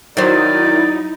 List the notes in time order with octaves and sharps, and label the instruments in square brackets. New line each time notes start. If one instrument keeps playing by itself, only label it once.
[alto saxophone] D#3 [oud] F#3 C5 [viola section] D#4 E4 [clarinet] D5